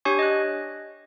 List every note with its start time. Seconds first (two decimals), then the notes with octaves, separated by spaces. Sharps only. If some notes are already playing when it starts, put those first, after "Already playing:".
0.05 D4 G4 C#5 G#5 C#6
0.19 D#5 F#6